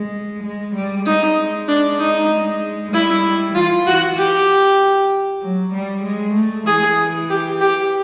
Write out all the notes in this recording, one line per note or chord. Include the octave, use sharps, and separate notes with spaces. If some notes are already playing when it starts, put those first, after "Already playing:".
Already playing: G#3
G#3
G3
G#3 D#4
D4
D#4
G#3
G3 E4
E3 F4
E3 F#4
G4
F#3
G3
G#3
A3
E3 G#4
G4
G4